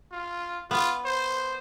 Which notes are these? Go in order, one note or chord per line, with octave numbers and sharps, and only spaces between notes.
F4
B3 F4
C5